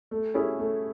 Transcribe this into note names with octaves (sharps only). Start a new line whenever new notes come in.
A3
C#4 E4 G#4
A3